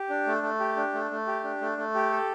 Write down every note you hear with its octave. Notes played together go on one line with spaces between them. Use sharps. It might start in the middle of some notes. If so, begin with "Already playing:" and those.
Already playing: G4
D4
A3
A3
G4
D4
A3
A3
G4
D4
A3
A3
G4
A4